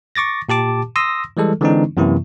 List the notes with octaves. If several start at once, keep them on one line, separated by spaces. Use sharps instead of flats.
C#6 D6 A6 A#6
A#2 G4 A5 D6
C6 D#6 E6 A#6
E3 G3 G#3 A4
D3 E3 G#3 C4 D4 D#4
F#2 C3 E3 A#3 E4